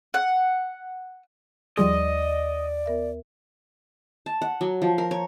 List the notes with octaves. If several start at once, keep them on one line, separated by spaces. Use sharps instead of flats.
F#5
D#2 F3 G3 G#4 D5 D#5 C6
B3 A#4 E5
A5
F#5
F#3
F3
A#4
C#5